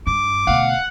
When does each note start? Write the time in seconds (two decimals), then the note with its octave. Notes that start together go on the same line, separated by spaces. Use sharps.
0.07 G2 D6
0.47 D2 B2 F5 F#5